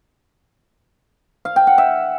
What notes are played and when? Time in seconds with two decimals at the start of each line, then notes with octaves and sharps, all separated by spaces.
1.45 F5
1.56 G5
1.67 F#5
1.78 E5